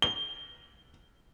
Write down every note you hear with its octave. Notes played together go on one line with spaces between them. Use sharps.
G7